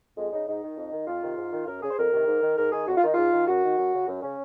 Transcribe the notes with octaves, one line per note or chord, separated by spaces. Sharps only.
F2 G#3
C#3 D#4
G#2 D#4
D#3
F2
D#3
F2 F4
C3 D#3
G#2
D#3
F#2 A#4
C#3 G#4
C5
F2 A#4
C3 D#3
G#2
D#3
G#2 A#4
D#3 G#4
F2 F#4
F4
D#3 D#4
G#2 F4
D#3
F#2 F#4
D#3
F#2
C#3
F#2
C#3 C#4